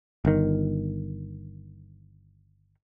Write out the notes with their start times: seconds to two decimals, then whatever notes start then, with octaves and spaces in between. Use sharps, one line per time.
0.25 G1 D#3